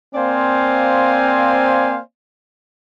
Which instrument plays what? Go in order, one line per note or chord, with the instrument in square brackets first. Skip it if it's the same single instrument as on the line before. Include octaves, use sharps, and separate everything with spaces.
[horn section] A#3 C4 C5 D5 F5 G#5